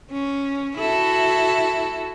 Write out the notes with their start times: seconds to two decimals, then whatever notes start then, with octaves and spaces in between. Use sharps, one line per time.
0.12 C#4
0.78 E4 F#4 A4